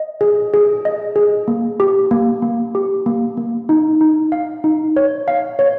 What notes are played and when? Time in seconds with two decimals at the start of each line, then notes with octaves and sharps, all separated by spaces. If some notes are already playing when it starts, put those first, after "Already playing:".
Already playing: D#5
0.21 G#4
0.54 G#4
0.85 D#5
1.16 G#4
1.48 A#3
1.80 G4
2.11 A#3
2.42 A#3
2.75 G4
3.06 A#3
3.37 A#3
3.69 D#4
4.01 D#4
4.32 F5
4.64 D#4
4.96 C#5
5.28 F5
5.59 C#5